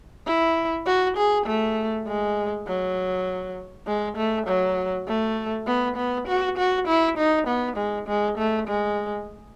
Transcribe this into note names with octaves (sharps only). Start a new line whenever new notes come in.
E4
F#4
G#4
A3
G#3
F#3
G#3
A3
F#3
A3
B3
B3
F#4
F#4
E4
D#4
B3
G#3
G#3
A3
G#3